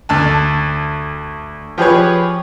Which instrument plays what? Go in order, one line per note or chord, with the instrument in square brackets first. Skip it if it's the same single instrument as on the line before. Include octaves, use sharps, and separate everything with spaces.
[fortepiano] D2 A5
F3 G4 G#4 B4 C#5